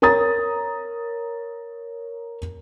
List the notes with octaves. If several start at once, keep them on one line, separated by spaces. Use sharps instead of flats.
A#4 C#5 A#5 D#6 A6